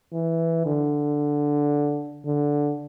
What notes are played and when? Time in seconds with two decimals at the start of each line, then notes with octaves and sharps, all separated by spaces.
0.13 E3
0.66 D3
2.26 D3